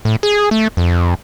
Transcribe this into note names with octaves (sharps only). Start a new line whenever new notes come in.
A2
G#4
A3
F2